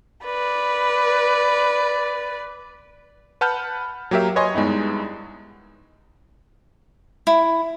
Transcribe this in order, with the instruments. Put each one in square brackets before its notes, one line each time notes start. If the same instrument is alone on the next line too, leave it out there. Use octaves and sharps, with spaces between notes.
[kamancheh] B4 D5
[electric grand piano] B4 F#5 A5 B5 F6 G6
F#3 A#3 G4 A#4 E5
B4 C#5 D#5 G#5 C6
G2 G#3 B3 D#4 E4
[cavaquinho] E4